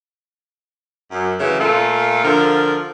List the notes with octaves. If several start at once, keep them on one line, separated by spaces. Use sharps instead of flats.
F#2
C#3 E3 F#3 A3
A#2 A3 F4 A4
D3 F3 F4 A#4